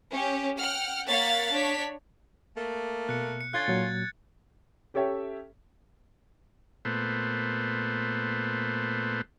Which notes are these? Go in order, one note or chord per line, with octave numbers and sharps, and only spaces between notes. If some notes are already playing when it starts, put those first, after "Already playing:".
C#4 G4
F#5 G5 F6
A#3 C#5 F5 F#5 A6 B6
D4 C#5 B6
A3 A#3
B2 F#6 C#7
C#7
D3 C#4 F4 F#6 G#6 A6
A#2 F#3
C#4 G4 A4 C#5 E5 G5
A#2 A3 B3 C5